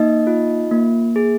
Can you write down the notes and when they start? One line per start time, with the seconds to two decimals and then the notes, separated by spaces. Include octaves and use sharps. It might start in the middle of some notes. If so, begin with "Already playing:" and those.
Already playing: A#3 D#4 D#5
0.27 F4
0.71 A#3
1.16 G#4